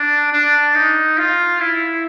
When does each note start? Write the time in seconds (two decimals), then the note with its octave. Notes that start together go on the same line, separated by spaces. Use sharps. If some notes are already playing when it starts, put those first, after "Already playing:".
Already playing: D4
0.32 D4
0.75 D#4
1.18 F4
1.60 E4